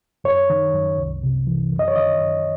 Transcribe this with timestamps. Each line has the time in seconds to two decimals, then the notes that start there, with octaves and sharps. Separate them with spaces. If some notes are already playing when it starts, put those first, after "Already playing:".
0.24 F#2 C#5
0.50 D#3
0.74 F#2
0.98 C2
1.23 C3
1.47 E3
1.73 F#2
1.79 D#5
1.88 C#5
1.96 D#3 D#5
2.21 F#2